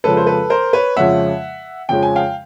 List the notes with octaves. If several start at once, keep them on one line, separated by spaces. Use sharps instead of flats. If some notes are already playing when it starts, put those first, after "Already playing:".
F2 C#3 F3 G#3 C#4 A4 B4
C5
A4 B4
A#4 C5
B4 C#5
F2 C#3 F3 G#3 C#4 E5 F#5
F2 C#3 F3 G#3 C#4 G5
G#5
F5 G5